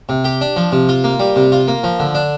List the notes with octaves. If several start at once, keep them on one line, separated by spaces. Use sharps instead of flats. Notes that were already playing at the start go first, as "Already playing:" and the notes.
C3
G4
D4
F3
C3
F4
A#3
G3
C3
F4
A#3
F3
D3
D4